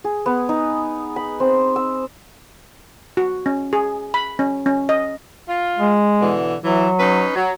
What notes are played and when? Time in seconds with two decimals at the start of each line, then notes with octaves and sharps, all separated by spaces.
0.04 G#4
0.26 B3
0.49 D#4
1.16 B5
1.40 C4
1.76 E6
3.17 F#4
3.46 C#4
3.73 G#4
4.14 B5
4.39 C#4
4.66 C#4
4.89 D#5
5.48 F4
5.78 G#3
6.21 B2 D3 E3
6.64 E3 F#3
7.00 C#4 D#4 B4
7.36 F#3